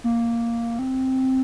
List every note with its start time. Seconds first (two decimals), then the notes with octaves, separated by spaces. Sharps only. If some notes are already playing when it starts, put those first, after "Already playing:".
0.04 A#3
0.79 C4